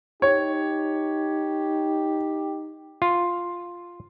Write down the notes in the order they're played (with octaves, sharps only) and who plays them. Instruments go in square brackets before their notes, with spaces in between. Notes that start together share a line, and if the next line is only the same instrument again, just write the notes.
[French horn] D#4 [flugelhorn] G4 [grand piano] C#5
[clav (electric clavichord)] F4